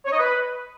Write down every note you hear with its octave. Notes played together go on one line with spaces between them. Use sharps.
C#5
D#5
B4